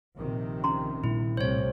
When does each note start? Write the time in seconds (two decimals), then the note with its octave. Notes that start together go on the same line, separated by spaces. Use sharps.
0.16 A#1 C3 D#3
0.64 C#4 A#5 C6
1.04 A#2 G3 D4 E4
1.37 C2 A2 C3 C5 C#5